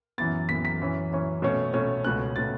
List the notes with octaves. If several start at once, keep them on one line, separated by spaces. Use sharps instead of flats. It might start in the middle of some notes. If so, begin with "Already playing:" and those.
F#2 E3 B3 A6
F#2 E3 B3 B6
B6
F#2 E3 C#4
F#2 E3 C#4
B2 A3 C#4
B2 A3 C#4
C#2 B2 A3 C#4 F#6
B2 A3 C#4 A6